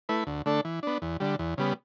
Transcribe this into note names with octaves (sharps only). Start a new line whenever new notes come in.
A3 E4 B4
D2
D3 A3 D4 A4
E3
B3 D4
E2
D3 G3
E2
C#3 G3 B3